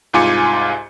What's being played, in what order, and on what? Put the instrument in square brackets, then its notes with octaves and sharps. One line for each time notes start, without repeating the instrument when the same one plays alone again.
[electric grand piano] C2 G#2 F4 G#5 D6 C#7